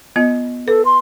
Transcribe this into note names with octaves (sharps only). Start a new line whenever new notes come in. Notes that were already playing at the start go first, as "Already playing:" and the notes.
B3 F4 D#5
A4 B4
C6